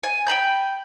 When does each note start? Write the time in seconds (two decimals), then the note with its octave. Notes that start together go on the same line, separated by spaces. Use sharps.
0.03 G#5
0.27 G5 A#5 B5 G6